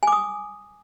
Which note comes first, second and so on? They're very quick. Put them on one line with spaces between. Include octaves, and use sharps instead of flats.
G#5 D6 D#6